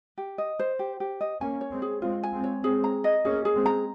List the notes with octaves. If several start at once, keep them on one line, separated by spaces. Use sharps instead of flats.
G4
D#5
C5
G4
G4
D#5
A#3 C#4 G#5
C#5
G#3 C4
G#4
G#3 C4 F4
G#5
G#3 C4
C#5
G#3 C4 G#4
A#5
D#5
A#3 C#4 G#4
G#4
G#3 C4
A#5